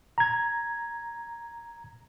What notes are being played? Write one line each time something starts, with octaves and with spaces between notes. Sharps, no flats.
A#5 G#6